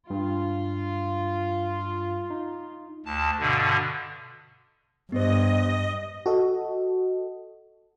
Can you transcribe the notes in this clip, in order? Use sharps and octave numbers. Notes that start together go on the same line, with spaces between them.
G2 F4
D#4
D2 A5
G2 B2 D3
G2 B3 C5 D#5
F#4 A4 D#5